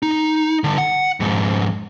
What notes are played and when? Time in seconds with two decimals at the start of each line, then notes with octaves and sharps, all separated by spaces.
0.02 D#4
0.64 D3 G3
0.78 F#5
1.20 F2 G#2